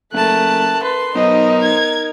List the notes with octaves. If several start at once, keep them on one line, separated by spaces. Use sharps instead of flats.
F#1 A3 A#4 A5 F#6
B4 C6
B1 D#4 A#4 C5 D#5
G#6